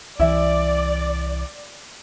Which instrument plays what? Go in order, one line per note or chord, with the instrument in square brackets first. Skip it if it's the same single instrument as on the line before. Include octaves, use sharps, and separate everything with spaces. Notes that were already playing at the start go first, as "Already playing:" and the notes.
[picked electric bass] C2 E3 [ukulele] E4 E5 [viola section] D5